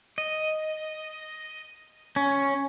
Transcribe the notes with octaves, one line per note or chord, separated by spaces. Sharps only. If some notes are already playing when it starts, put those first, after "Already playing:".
D#5
C#4